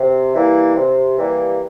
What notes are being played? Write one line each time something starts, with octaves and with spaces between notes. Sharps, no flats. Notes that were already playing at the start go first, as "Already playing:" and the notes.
Already playing: C3
E3 G3 A#3
C3
E3 G3 A#3